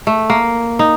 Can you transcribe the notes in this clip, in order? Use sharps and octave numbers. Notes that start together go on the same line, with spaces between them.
A3
A#3
D#4